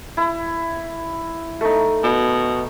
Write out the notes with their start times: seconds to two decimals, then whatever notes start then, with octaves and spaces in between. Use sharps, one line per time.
0.17 E4
1.61 A3 D#4
2.04 B2